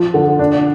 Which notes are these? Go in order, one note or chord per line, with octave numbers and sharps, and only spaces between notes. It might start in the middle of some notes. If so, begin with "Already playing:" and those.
Already playing: F3
D3
D4